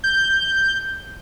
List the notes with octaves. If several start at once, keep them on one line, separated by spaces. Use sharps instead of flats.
G6